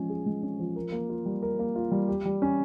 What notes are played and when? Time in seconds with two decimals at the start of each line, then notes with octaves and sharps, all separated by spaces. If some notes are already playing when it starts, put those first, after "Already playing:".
Already playing: F3 G#3 C#4
0.10 G#4
0.26 G#3
0.43 C#4
0.59 F3
0.76 A#4
0.92 A#3
1.10 F4
1.26 G3
1.42 A#4
1.59 A#3
1.76 F4
1.91 G3
2.08 G4
2.25 G3
2.42 C#4